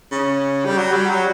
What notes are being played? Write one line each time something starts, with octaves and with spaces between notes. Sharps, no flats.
C#3
G3
F#3
G3
F#3